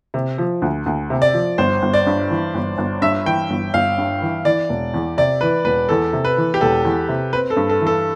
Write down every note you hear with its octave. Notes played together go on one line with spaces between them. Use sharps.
C3
F3
D2
D2
C3
D5
F3
G1 C5
G1
D5
G2
E3
G1
G1
G2 E5
E3 G5
G1
G1 F5
G2
E3
E3 D5
E1
E2
C3 D5
E3 B4
E1 B4
E2 A4
C3
B4
E3
G4
E1 A4
E2
C3
C4 B4
A4
G2
A4
E3
A4